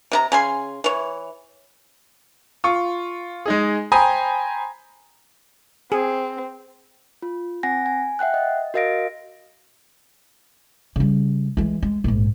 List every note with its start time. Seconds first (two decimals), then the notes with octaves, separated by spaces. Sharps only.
0.12 C3 D#4 A#5
0.32 C#3 G#5 C6
0.84 E3 C#5
2.64 F4 C#6
3.46 G#3 D#4 G#4
3.92 C5 G5 G#5 A#5 B5 D#6
5.92 C4 G#4
7.22 F4
7.63 C4 F#5 G#5 A#6
7.86 G#5
8.19 E5 F#5 G5 F#6
8.34 D#5
8.74 F#4 A#4 D#5 F5 A#6 D7
10.96 C#3 G3
11.57 E3 G#3
11.82 G#3
12.04 A#1 G#2